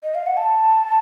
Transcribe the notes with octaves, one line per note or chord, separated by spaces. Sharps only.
D#5
F5
F#5
A5